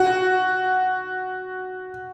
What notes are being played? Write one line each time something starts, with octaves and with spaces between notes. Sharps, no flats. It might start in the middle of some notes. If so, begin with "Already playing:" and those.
Already playing: F#4